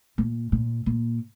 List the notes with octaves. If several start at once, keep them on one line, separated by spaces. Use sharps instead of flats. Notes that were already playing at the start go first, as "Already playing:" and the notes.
A#2
A#2
A#2